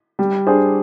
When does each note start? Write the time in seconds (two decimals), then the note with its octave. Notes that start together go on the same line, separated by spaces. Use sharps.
0.19 G3
0.47 D4 G#4 C5